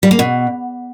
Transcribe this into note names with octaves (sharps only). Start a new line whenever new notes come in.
G3
A#3
B2